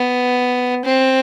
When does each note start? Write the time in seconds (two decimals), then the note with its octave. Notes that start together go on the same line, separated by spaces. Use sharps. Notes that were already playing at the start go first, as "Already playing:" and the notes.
Already playing: B3
0.85 C4